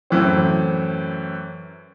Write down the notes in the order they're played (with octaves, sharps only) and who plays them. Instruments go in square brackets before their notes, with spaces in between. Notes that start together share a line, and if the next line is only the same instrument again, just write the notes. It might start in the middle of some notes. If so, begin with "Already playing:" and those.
[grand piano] F#2 A2 E3 C4